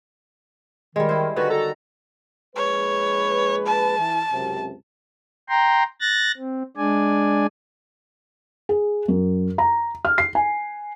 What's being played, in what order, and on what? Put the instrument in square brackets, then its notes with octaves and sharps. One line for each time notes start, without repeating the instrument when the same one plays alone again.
[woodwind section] D#3 [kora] G3 G#3
[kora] E4 C5
[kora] D3 D#3 [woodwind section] F#4 B4
[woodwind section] F#4 A4 A#5
[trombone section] A#1 G#3 B4 [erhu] C#5
[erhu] A5
[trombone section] E3
C#2 F#2 C3
[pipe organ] G5 A#5 C6
F#6 A6 A#6
C4
G#3 D4 D5 G#5
[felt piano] G#4
F#2
A#5
F6
C7
G#5